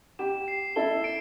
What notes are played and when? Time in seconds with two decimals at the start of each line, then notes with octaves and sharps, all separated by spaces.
0.19 G4 E7
0.48 C7
0.76 E4 A4 G7
1.04 D7